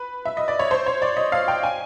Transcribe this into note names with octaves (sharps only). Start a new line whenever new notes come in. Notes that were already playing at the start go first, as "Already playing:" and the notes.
Already playing: B4
E5
D#5
D5
C#5
C5
C#5
D5
D#5
F5
G5
G#5